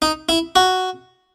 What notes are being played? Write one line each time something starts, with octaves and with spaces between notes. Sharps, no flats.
D#4
E4
F#4